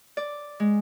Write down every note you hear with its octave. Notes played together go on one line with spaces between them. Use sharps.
D5
G#3